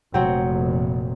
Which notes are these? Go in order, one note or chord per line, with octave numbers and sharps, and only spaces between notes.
F1 A#2 F#3 C4